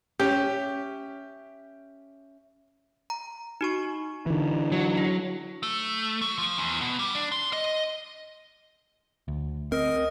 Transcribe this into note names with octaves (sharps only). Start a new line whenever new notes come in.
C#4 G4 E5
A#5
D#4 F#4 C#6
D3 E3
F#3
E4
A3
F#3
F3
E2
B2
G3
D4
C6
D#5
D2
C4 A#4 D#5